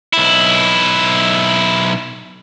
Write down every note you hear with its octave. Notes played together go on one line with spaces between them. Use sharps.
B1 E4